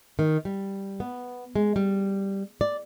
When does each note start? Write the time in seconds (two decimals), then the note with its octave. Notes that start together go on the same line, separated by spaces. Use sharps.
0.19 D#3
0.45 G3
1.00 B3
1.56 G#3
1.76 G3
2.61 D5